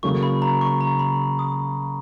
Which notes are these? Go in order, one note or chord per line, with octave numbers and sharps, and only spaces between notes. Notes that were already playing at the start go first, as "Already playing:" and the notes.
C#3 F#3 A#3 C#6
B5
A#5
C#6
A#5
B5
D#6